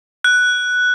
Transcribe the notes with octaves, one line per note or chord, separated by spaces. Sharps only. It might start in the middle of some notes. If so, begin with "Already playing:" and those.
F#6